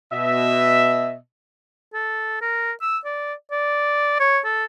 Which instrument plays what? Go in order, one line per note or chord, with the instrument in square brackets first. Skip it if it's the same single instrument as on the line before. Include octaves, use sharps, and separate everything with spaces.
[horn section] B2 D#5 E5
[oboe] A4
A#4
E6
D5
D5
C#5
A4